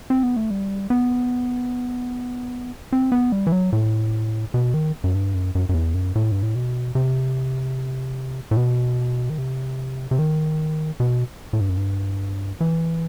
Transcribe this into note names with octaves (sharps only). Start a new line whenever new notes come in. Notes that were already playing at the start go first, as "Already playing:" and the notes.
C4
B3
A3
G3
B3
C4
B3
G3
E3
F#3
A2
B2
D#3
F#2
G2
F#2
F#2
F#2
E2
F#2
A2
G2
A2
B2
C3
A2
B2
D#3
C3
C3
D#3
B2
A2
G2
F#2
G2
E3